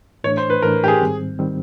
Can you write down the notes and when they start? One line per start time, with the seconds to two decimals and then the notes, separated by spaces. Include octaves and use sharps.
0.24 A2 E3 A3 D4 C#5
0.37 C5
0.50 B4
0.62 A2 E3 A3 D4 A#4
0.84 G4
0.88 G#4
1.01 G#2 D#3 G3 C4
1.39 D#3 G3 C4